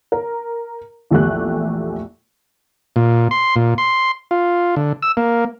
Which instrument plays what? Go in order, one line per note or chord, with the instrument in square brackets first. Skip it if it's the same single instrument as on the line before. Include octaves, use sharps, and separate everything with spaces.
[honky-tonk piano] A#4
A#1 E2 A3 G4 F#6
[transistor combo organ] A#2
C6
A#2
C6
F4
D3
E6
A#3